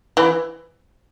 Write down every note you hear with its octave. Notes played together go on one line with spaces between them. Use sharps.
E3